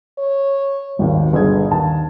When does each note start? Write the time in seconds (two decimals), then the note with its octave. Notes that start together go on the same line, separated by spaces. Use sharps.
0.18 C#5
0.99 G#1 D#2 B2
1.33 G1 G#4 G#6
1.71 D#2 A5